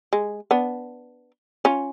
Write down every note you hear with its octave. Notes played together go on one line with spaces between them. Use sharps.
G#3
B3 D4
C#4 F4